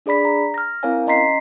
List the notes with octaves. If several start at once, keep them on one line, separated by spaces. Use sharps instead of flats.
D4 G#4 D5 B5 B6
A#5
F6 A#6
C4 E4 A#4 C#5 F5 G#5
C#4 D#5 A#5 C6 B6 C7